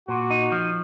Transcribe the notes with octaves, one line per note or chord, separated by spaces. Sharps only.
A#2 F#4
D#4
F3